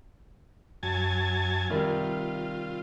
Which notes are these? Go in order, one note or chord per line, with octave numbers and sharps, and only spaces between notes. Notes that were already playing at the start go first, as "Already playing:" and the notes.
F#2 G#5 A5
C3 D#3 G3 F4